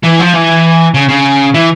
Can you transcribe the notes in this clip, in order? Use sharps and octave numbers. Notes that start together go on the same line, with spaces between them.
E3
F3
E3
C#3
C#3
E3